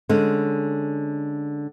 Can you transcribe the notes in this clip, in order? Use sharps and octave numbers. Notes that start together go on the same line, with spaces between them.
D3 G#3 C#4